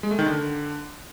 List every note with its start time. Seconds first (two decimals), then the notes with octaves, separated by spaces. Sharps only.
0.03 G#3
0.11 A3
0.19 D#3
0.26 D3